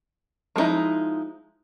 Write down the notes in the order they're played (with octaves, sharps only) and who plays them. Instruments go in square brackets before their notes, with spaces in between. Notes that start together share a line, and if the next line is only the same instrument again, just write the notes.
[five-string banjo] F3 G#3 B3 D#4 E4